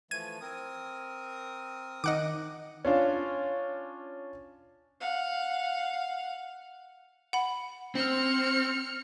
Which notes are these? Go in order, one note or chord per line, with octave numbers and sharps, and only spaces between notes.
E3 F3 A3 G#6 D#7
C4 A#4 D#6
D#3 D#4 D#5 F#5 D6
C#4 D4 F4
F5 F#5
F#5 B5
C4 F6 C#7